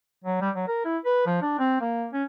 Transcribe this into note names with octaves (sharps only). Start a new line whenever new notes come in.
F#3
G3
F#3
A#4
E4
B4
F3
D4
C4
A#3
C#4